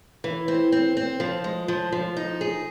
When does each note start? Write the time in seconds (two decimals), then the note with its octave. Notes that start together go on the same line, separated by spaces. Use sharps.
0.24 E3
0.48 C4
0.72 C4
0.97 C4
1.20 F3
1.44 G#3
1.68 F3
1.92 F3
2.17 D#4
2.41 G#4